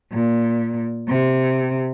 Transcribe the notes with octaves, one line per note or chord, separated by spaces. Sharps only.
A#2
C3